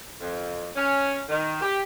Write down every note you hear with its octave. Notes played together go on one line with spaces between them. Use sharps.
F2
C#4
D#3
G4